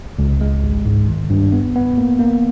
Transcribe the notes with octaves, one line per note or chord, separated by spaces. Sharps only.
C#2
G#3
G#1
G#2
D#3
G2
B3
B3
A#3
A#3